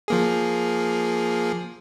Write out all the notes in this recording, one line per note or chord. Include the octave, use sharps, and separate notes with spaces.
F3 A#3 G#4